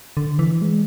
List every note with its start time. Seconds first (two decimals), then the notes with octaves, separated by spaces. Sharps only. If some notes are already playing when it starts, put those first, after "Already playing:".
0.17 D3
0.39 E3
0.62 G#3